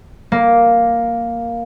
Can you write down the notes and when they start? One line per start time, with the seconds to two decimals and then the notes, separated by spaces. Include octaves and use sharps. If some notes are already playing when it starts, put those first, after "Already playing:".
0.32 A#3